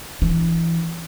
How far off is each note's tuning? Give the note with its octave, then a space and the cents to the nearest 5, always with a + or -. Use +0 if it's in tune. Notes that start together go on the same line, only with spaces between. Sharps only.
E3 +15 D4 +0